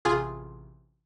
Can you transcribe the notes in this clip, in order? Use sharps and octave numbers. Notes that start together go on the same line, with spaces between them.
A1 C3 F4 G#4 G#5